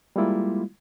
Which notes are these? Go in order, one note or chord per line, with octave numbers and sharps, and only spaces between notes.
G3 G#3 A#3 E4 F4